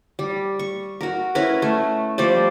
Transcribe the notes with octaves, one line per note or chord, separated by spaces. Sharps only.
G3
C#6
F#4 A#4
C#4 E4 A#4 B4
A3
F3 G3 C5 D5